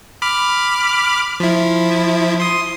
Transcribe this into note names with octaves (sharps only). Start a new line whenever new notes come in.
B5 D6 F6
F3 E4
C6 D#6